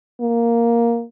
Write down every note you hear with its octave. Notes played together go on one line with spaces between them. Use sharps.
A#3